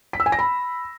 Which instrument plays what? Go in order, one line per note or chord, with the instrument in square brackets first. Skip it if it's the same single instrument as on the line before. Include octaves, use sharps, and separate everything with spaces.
[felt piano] B6
E6
G#5
A#6
B5